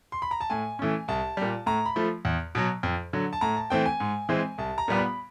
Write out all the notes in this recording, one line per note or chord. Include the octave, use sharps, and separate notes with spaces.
C6
B5
A#5
A5
A2 G#5
E3 A3 C#4
C2 A5
A#2 G3
A2 A#5
B5
F3 A3
E2
B2 F#3
F2
D3 F#3
A5
A2 A#5
A5
E3 A3 C4 G5
G#5
G#2
E3 G#3 C4
C2 A5
A#5
A#2 G3 B3
B5